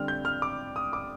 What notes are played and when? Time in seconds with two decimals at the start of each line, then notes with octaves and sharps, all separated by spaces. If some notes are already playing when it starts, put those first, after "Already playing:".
Already playing: D3 G3 C4 F6
0.08 G6
0.25 F6
0.42 D6
0.76 D#6
0.93 D6